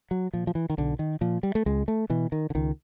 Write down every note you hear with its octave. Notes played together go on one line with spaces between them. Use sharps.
F#3
A#2 F3
F3
E3
D#3
B1 D3
D#3
A#2 F3
G3
A3
C#2 G#3
A3
B2 E3
D#3
D3
C#2 D#3